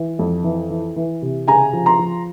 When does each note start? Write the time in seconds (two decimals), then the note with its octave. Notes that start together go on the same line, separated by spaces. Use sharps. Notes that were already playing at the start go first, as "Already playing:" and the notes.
Already playing: E3
0.19 F2
0.44 E3
0.70 E3
0.96 E3
1.22 C3
1.47 C#3 G#5 A#5
1.73 F3
1.86 A#5 C6
1.99 F3